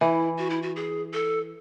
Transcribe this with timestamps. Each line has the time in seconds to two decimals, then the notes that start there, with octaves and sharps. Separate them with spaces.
0.01 E3 E4
0.38 F#4
0.50 E4
0.62 F#4
0.76 G#4
1.13 A4